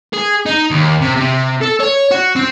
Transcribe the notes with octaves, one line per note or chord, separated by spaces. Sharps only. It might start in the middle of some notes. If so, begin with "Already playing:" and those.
G#4
D#4
D#2
C3
C3
A4
C#5
F#4
C4